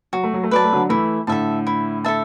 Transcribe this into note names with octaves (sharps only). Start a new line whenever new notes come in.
F#3 F#4
A3
F#3
A3
F#3 B4 D5 A5
A3
D3 F#3
E3 A3 E4
A2 D3 A4 E5 A5
E4
A4 E5 A5